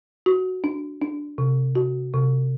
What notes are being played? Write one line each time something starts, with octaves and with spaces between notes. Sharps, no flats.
F#4
D4
D4
C3
F#4
C3